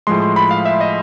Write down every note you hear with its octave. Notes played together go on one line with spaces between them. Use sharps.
A2 F3 G#3 C6
C6
B5
F5
E5
D#5